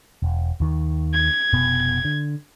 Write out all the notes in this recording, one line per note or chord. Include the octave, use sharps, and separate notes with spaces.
E1
D#2 D#3
G#6
F1 B2 B3
D3